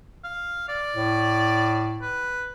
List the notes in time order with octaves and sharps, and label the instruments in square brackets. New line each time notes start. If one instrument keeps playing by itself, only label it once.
[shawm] F5
D5
[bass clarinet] A2
[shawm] B4